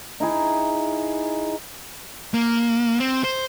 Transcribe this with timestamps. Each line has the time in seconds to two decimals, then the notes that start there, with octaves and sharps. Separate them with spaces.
0.20 D#4 E4 G#4
2.34 A#3
3.00 C4
3.24 C5